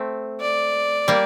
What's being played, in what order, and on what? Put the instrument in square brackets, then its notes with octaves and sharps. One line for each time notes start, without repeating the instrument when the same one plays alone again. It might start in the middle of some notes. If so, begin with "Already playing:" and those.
Already playing: [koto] A3 C4
[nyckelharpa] D5
[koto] G3 A#3